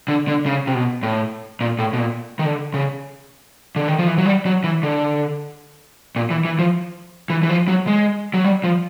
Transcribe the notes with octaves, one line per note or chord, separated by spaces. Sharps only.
D3
D3
C#3
C3
B2
A2
A#2
A2
B2
A#2
D#3
D3
C#3
D3
D#3
F3
E3
F#3
G3
F#3
E3
D3
A#2
E3
E3
F3
E3
E3
F3
F#3
G#3
F#3
G3
F3